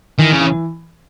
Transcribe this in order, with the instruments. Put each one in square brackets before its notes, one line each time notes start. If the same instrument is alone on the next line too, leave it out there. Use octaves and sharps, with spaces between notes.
[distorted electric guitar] D#3 [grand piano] E3
[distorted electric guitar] C#3
[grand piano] E3